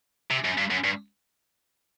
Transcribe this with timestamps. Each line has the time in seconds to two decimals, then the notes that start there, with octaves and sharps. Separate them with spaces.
0.30 C3
0.44 F#2
0.57 G2
0.70 F#2
0.84 G2